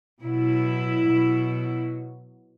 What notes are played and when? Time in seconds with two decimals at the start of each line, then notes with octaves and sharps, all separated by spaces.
0.23 B2 F#3 E4
1.07 B2 F#3